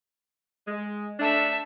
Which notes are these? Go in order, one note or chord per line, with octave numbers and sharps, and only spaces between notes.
G#3
A3 D4 E5 A5